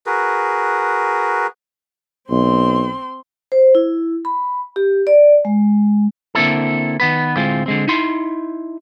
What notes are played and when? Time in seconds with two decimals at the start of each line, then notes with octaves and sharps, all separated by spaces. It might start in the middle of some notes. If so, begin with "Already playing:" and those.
0.06 F#4 G#4 A#4 B4
2.31 B1 C4 C6
3.52 C5
3.75 E4
4.25 B5
4.76 G4
5.07 D5
5.45 G#3
6.35 D3 A#3 C4 E4 A4
7.00 D#3 B3 B4
7.36 D2 A2 G#3 C4 F4
7.66 D3 G#3 C4
7.88 D#4 E4 C6